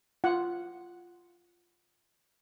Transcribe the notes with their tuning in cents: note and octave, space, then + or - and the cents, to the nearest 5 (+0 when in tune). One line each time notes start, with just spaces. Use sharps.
F4 -5 F#5 +0